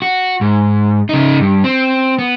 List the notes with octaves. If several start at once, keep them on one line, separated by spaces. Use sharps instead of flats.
F#4
G#2
C#3 D#4
G2
C4
B3